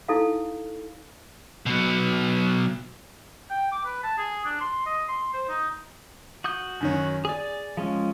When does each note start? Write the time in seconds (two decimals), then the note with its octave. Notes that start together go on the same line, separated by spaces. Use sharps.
0.08 D#4 E4 A4 F5
1.66 B2 F#3
3.50 G5
3.72 D6
3.85 B4
4.03 A5
4.18 G#4
4.45 D4
4.60 C6
4.86 D#5
5.08 C6
5.34 C5
5.49 D#4
6.44 F#4 D#6 G6
6.81 F#2 D#3 C#4
7.25 G#4 D5 G#5
7.77 F3 G#3 C#4